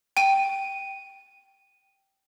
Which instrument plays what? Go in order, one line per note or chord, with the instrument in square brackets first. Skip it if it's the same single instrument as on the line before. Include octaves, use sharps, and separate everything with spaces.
[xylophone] G5 D#7